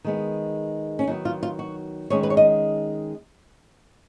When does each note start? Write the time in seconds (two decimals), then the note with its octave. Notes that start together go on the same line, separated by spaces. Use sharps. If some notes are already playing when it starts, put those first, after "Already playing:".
0.04 D#3 G#3 B3
0.99 C#4
1.07 D#3 F#3 B3 D#4
1.25 F4
1.43 F4
1.59 F#4
2.10 D#3 G#3 C#4 C#5
2.23 B4
2.30 C#5
2.37 D#5